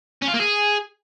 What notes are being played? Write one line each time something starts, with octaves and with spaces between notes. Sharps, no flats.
C#4
F4
A#3
G#4